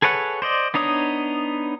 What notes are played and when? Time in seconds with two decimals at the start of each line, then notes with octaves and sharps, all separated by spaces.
0.02 G#4 A4 B4 C#5 F#5
0.42 C5 D5 D#5
0.74 B3 D4 D#4 C#5 D#6